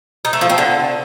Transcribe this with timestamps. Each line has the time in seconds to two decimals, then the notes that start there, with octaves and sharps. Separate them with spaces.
0.25 D#4
0.33 A3
0.41 F3
0.50 C4
0.58 D3